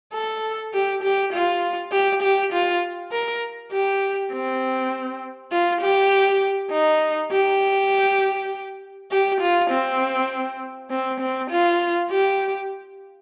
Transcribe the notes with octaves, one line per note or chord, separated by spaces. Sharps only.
A4
G4
G4
F4
G4
G4
F4
A#4
G4
C4
F4
G4
D#4
G4
G4
F4
C4
C4
C4
F4
G4